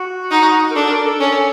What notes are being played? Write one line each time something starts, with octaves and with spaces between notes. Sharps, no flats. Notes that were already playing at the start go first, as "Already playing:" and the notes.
Already playing: F#4
D#4
A#4
D4 A4
A#4
A4
C#4 A4